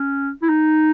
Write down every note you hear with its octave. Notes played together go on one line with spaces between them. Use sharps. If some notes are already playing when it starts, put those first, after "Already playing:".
Already playing: C#4
E4
D#4